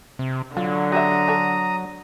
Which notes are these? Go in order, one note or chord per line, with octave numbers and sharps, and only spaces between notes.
C3
D3 F#3 F4
F#4 G4 E5 A#5 D#6
D4 A4 C#5